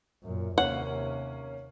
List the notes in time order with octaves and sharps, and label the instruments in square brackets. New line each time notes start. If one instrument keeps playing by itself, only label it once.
[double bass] F#2 A#2
[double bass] D#2 C3 [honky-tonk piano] A#3 C#4 [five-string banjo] F#5